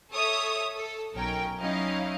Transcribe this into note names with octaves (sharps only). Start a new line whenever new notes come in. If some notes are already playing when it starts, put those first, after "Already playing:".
A4 C#5 E5 D#6
A4
B1 C#4 D#4 A#4 G5
F#3 C#4 D#4 E4 D#5 F5